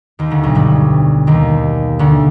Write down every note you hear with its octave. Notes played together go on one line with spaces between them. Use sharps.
D#2 D#3
D2 D3
B1 B2
G2 G3
D#2 D#3
D2 D3